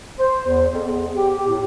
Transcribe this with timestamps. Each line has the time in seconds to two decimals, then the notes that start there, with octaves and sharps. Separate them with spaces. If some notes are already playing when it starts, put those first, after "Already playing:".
0.19 C5
0.47 E2
0.74 F2
0.86 E2
1.15 G4
1.47 A2